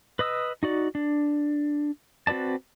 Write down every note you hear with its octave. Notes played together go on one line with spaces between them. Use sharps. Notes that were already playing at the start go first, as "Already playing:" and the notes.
B4 D#5 D#6 E6
D#4 F#4 D5
D4
C4 F#4 B4 D5 A5